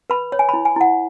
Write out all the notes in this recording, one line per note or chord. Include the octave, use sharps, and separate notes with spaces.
B4 B5
C#5
G#5
E4 B5
G#5
E4 F#5